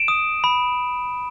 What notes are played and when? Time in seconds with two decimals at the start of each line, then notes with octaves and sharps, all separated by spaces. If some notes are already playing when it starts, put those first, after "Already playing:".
Already playing: D7 E7
0.08 D#6
0.44 B5